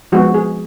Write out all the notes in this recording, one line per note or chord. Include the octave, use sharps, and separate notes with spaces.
F3 G#3 B3 F#4
G#4